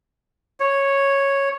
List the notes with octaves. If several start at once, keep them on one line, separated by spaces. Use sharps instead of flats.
C#5